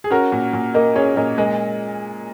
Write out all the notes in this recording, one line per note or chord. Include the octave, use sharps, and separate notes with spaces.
G#4
C#4 F#4 A#4
A#2
A#2
A#3 A#4 D#5
C#4 G#4 C#5
A#2 A#4 D#5
G#3 A#4 D#5